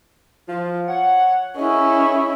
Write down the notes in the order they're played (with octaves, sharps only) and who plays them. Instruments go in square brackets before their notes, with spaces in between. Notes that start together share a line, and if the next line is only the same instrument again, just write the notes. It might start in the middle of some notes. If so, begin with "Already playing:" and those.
[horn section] F3 F4
C#5 F#5
[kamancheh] C#4 E4 [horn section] G#4 D#5